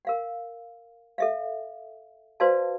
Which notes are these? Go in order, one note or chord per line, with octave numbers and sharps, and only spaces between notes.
A#4 F5 F#5
A4 E5 F5
F#4 B4 C5 D5 F5 A5